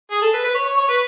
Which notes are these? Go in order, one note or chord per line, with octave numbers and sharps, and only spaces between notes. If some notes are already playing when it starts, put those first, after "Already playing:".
G#4
A4
B4
B4
C#5
C#5
C#5
B4